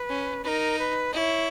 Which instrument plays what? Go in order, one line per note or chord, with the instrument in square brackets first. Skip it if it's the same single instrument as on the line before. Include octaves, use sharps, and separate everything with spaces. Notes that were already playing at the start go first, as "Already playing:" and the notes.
Already playing: [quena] B4
[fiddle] C#4
[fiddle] D#4 [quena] A#4 B4
[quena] B4
[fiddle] E4 [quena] D#5
[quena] C#5